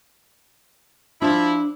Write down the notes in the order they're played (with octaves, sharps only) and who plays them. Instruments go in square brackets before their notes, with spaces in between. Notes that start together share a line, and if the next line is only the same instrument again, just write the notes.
[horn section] F3 E4 [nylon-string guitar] D4